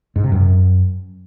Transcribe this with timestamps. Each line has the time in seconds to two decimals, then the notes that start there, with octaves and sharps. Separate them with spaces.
0.16 G#2
0.24 C3
0.32 F#2